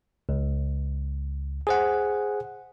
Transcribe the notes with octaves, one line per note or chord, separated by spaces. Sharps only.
C#2
G#4 C5 F#5